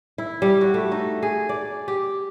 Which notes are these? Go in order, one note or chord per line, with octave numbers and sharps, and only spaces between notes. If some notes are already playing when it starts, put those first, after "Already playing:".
E4
G3
F#4
A3
D#4
G#4
D5
G4